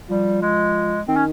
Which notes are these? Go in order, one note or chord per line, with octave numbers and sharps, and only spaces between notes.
F3 G3
G#3
D#3 C4
C#4